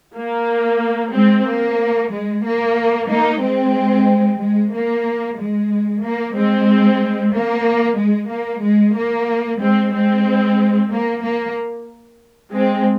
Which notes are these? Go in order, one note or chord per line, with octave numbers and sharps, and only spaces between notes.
A#3
G#3 C4
A#3
G#3
A#3
A#3 D#4
G#3 C4
G#3
A#3
G#3
A#3
G#3 C4
A#3
G#3
A#3
G#3
A#3
G#3 C4
G#3 C4
A#3
A#3
G#3 C4